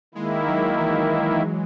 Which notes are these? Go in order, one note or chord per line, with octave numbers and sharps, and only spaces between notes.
D#3 G#3 A#3 E4
F#3
E3